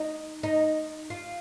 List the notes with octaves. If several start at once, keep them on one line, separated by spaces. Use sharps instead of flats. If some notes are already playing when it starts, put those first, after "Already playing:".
Already playing: D#4
D#4
F4